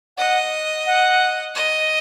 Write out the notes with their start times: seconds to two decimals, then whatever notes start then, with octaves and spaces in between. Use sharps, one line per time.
0.17 D#5 F#5
0.86 F#5
1.55 D#5